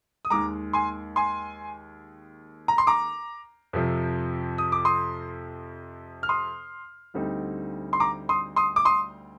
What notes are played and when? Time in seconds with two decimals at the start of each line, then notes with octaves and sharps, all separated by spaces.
0.25 D#6
0.30 D#2 D#3 G#3 A#5 D6
0.73 G#5 C6
1.16 G#5 C6
2.68 A#5
2.78 C6
2.87 A#5 D6
3.73 F2 C3 F3 C4
4.58 D#6
4.72 D6
4.85 C6 D#6
6.23 F6
6.29 C6 D#6
7.14 D2 D3 G3 C4 D#4
7.93 C6
8.00 A#5 D6
8.29 C6 D#6
8.56 C6 D#6
8.76 D6
8.85 C6 D#6